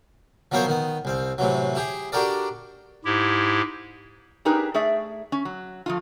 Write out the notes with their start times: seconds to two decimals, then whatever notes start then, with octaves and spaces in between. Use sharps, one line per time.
0.52 F3 F#3 B3 A#4 C5 C#5
0.66 D#3 B3
1.05 C2 C4
1.38 A2 C3 E3 F#3
1.75 E4 G4 G#4
2.12 D4 F#4 G4 A4 A#4 D5
3.05 G#2 E4 G4
4.45 D4 D#4 G4 G#4 A#4 B4
4.74 A3 G#4 D5 E5
5.32 C#4
5.45 F#3
5.86 F3 A3 F4